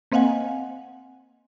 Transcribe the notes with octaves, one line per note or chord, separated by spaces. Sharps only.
A#3 C4 D#5 F5 F#5 G#5